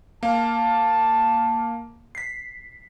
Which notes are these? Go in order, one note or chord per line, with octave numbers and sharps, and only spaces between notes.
A#3 F5 A5
B6 C7